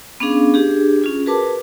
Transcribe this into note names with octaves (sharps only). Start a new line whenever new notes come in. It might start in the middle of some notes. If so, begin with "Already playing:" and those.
B3 C#4 D4 G#4 F5
D4 G4 G#4
C#4 F4 G#4
F#4 G#4 A#4 B4 A5 D6